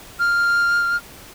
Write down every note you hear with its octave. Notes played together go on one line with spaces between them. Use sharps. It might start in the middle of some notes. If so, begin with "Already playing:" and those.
F6